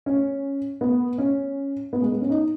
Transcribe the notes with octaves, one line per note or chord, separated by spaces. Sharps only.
C#4
B3
C#4
B3
G#3
B3
C#4
D#4